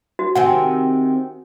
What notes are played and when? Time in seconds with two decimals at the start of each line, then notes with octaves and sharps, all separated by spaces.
0.19 F#4
0.35 C3 D#3 C4 F#5 G#5